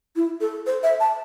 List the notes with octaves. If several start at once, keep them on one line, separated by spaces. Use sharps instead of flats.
E4
A4
C5
E5
A5